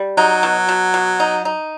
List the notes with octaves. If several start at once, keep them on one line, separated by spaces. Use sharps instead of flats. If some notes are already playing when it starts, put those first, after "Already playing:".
Already playing: G3
F#3 D#4
B2
B2
B2
D#4
D#4